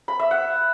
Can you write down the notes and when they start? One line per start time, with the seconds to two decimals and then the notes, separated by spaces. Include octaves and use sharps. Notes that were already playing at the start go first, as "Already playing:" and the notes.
0.08 B5
0.19 E5
0.31 F#5